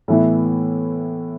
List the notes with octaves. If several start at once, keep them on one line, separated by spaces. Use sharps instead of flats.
A2 E3 B3 E4